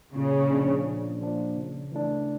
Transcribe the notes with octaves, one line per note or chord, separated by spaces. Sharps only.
A#2 C#3
F3 A#3 D4
A#2
F3 A#3 D4
C#3
E3 A3 D4